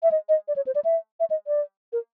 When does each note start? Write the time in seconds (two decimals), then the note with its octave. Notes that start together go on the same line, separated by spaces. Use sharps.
0.03 E5
0.12 D#5
0.29 D#5
0.48 D5
0.56 C#5
0.67 C5
0.75 D5
0.85 E5
1.20 E5
1.30 D#5
1.47 D5
1.93 A#4